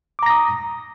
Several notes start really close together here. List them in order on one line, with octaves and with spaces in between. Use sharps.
D6 A#5 A#6 D#6